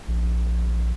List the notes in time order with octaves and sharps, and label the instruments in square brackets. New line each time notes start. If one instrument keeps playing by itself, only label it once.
[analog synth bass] A#1